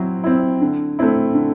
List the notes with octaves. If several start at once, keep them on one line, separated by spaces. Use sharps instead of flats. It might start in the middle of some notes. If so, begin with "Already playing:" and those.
Already playing: F#3 C4 E4
C4 E4
D3
A3 C4 E4
D3